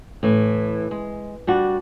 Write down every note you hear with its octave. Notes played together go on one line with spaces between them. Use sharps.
A2 E3
G#3
G3 D4 F#4